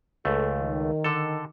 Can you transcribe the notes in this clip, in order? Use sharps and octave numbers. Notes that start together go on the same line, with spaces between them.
C#2 A3 A4
D#3
D3 A4